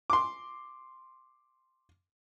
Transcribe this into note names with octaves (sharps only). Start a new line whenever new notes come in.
C6 D6